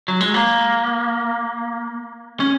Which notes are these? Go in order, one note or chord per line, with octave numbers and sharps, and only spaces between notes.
F#3
G#3
A#3
C#4